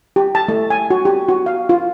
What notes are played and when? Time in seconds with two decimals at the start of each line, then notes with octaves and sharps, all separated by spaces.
0.16 G4
0.35 A5
0.48 A3
0.70 G#5
0.90 F#4
1.05 G4
1.29 F#4
1.46 F5
1.69 F4